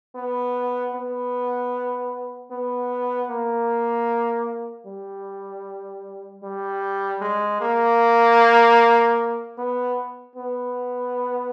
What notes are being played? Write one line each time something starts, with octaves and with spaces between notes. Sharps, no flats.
B3
B3
B3
A#3
G3
G3
G#3
A#3
B3
B3